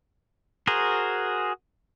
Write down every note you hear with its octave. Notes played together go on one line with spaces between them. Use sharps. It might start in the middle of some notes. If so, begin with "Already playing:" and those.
F#4 G#4 A#4 C5